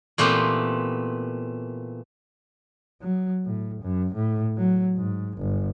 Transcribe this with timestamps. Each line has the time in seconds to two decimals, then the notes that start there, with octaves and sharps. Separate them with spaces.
0.18 A#2 E3 A3 B3 C4 G4
3.02 F#3
3.46 A2
3.82 F#2
4.15 A2
4.58 F#3
4.96 G#2
5.37 G1